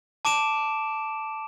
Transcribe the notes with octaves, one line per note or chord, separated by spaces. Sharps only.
A5 D6 D7 E7